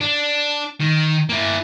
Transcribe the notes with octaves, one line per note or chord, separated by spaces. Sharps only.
D4
D#3
A#3 E4